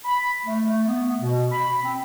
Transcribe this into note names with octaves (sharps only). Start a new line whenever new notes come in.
B5
A3
A3
B3
B2
B5
C4